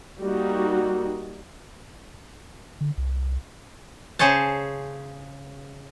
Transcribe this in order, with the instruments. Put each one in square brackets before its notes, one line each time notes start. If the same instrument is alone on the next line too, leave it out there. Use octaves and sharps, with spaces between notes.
[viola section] G3 A#3 D#4 F#4
[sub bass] D3
C2
[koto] C#3 G#4 C5 C#5 A5